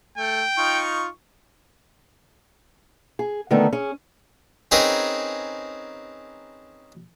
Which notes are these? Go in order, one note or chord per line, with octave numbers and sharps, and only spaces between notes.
A3 G5
D#4 F4 C#6
G#4
D3 D#3 A3 B3 D#4
C#4 G#4
C4 C#4 D#4 G#4 A#4 B4